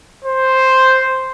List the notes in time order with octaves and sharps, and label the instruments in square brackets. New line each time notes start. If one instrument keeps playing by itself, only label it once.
[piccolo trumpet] C5